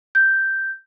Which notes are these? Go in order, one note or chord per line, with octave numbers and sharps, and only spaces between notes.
G6